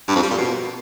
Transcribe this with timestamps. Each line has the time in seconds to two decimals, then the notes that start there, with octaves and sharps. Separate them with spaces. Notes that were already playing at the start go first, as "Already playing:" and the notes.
0.08 G2
0.15 F2
0.23 G3
0.30 A#2
0.38 B2